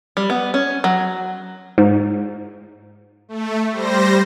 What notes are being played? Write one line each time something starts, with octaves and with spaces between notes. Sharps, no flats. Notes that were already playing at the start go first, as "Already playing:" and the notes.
G3
B3
C#4
F#3
G#2
A3
G3 C5 A#6